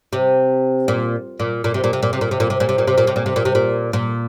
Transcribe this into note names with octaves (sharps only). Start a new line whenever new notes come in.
C3
A#2
A#2
A#2
C3
A#2
C3
A#2
C3
A#2
C3
A#2
C3
A#2
C3
A#2
C3
A#2
C3
A#2
C3
A#2
C3
A#2
A#2